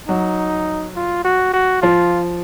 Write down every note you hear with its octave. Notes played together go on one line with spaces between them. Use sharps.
F#3 D#4
F4
F#4
F#4
F3 F4